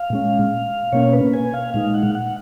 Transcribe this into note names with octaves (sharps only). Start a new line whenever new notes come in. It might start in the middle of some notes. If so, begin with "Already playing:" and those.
Already playing: F5
A#2 G#3 C#4
B2 A#3 C#4 C#5
B4
G#5
F5
A#2 G#3 D#4 F5
F#5
F#5